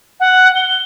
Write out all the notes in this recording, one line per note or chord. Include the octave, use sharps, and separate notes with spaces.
F#5
G7